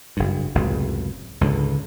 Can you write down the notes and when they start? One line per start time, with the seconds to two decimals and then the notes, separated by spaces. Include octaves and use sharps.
0.17 F#1 G2
0.55 F#1 C#2 A2 C3
1.41 C#2 G#2 D3